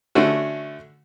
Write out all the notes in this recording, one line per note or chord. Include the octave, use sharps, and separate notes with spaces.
D3 A3 C#4 F#4